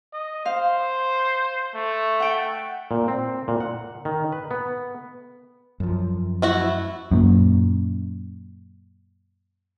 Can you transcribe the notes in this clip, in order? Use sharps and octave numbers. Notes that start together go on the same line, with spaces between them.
D#5
C5 F5
A3
F#5 G5
A#2
C4
A#2
F#5
D#3
B4
B3
F#2 F3
A3 E4 F#4
F#2 A#2